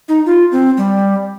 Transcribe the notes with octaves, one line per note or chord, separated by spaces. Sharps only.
D#4
F4
C4
G3